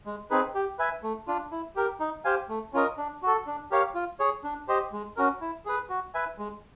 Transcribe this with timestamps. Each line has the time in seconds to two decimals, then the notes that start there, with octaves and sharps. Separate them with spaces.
0.06 G#3
0.30 C4 D#4 G#4 B4
0.55 G4
0.79 B4 E5 G#5
1.03 A3
1.27 D4 F4
1.52 E4
1.76 G4 A#4
2.00 D#4
2.25 G4 C5 F5 G#5
2.49 A3
2.73 C#4 F4 A#4 D#5
2.98 D4
3.23 F#4 A4
3.46 D4
3.71 G4 A#4 C#5 F5
3.95 F4
4.20 G#4 C#5
4.44 D4
4.68 G4 C5 D#5
4.92 G#3
5.17 C#4 F#4 A#4
5.41 E4
5.66 G#4 B4
5.90 F#4
6.14 B4 E5 G#5
6.38 G#3